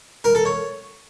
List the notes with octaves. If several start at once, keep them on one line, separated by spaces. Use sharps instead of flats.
A#4
A4
C#5